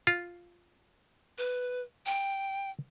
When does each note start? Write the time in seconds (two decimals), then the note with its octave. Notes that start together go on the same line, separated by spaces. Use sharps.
0.07 F4
1.38 B4
2.06 G5